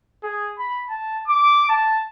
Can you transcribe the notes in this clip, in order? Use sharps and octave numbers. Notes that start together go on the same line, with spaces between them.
G#4
B5
A5
D6
A5